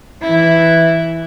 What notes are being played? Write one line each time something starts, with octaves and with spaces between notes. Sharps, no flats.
E3 E4